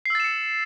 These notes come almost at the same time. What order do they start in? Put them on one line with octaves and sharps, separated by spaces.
C7 E6 A6 E7 C#7